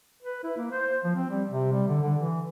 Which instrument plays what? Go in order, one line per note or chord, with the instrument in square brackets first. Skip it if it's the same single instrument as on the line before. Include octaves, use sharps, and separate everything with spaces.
[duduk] B4
E4
A#3
C5
F3
C4
G3
C3
G3
D3
D3
E3